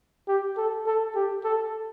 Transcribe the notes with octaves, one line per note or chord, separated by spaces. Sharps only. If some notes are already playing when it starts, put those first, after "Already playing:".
G4
A4
A4
G4
A4